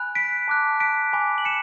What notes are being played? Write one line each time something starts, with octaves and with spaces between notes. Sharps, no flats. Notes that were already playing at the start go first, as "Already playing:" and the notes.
Already playing: G#5 B5 F#6
B6 D7
A5 D6 F#6
B6 D7
G#5 B5 D6
F#7
C#7 E7